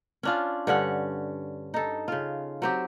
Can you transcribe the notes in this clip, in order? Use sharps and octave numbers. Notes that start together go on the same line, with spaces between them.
C#4 D4 F4
G2 D3 C#4 F#5
D#4 A4
C#3 F4
F#3 C4 G4